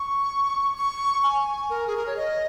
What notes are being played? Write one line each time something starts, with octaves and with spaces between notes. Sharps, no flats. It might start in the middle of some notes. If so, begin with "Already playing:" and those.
Already playing: C#6
C#6
G#5
A#4
G#4
A#4
C#5
D#5